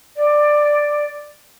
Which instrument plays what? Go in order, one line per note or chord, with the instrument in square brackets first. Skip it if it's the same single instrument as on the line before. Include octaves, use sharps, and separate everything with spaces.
[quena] D5